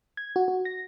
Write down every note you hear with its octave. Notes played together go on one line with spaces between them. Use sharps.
G#6
F#4
F#4
A#6